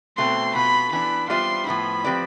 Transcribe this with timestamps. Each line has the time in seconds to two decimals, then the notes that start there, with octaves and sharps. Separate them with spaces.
0.18 B2 A3 C4 C6
0.55 B2 B3 F4 B5
0.92 E3 B3 D4 B5
1.30 G3 B3 F4 C5 E5 C6
1.67 A2 F3 B3 E4 B5
2.04 F3 C4 G4 B4 D5